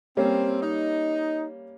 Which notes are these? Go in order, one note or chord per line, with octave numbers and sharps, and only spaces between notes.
G3 A#3 C4 C#4
D#4